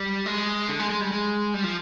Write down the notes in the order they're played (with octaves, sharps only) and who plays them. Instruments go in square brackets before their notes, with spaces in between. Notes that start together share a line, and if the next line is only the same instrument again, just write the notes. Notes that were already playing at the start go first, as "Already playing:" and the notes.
Already playing: [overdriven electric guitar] G3
G#3
D3
G#3
G#3
G3
G#3
G3
F3